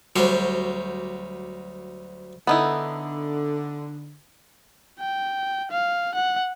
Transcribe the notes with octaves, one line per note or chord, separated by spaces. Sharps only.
D2 F#3 G3 C5
D3 B3 D#4 E4
G5
F5
F#5